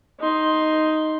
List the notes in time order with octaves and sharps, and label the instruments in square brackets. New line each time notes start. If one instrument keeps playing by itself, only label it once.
[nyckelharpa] D#4 C6